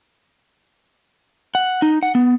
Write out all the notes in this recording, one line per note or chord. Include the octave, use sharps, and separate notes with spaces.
F#5
D#4
F#5
B3